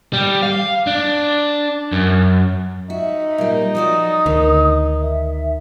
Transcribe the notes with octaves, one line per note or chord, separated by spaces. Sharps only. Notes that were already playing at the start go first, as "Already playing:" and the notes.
G3
F5
D4
F#2
D#4 F#4 E5
A#2 G3
F3 F#4 D5 D#6
D2 D#3
E5